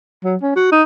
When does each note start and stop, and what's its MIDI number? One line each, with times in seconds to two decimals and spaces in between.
0.24 0.36 54
0.42 0.53 61
0.56 0.70 66
0.72 0.83 63